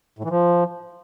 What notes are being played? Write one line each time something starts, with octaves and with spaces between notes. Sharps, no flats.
A2
E3
F3